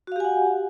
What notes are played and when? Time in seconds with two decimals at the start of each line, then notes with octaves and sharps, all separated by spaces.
0.07 F#4
0.12 F5
0.16 G4
0.20 G#5
0.25 F#5